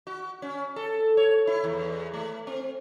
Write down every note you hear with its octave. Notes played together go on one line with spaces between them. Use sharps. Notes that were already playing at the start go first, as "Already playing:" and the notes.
F#4
C#4
A4
C#5
E4
E2
A3
C4